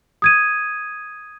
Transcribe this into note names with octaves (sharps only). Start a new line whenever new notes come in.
D#6 G#6 D#7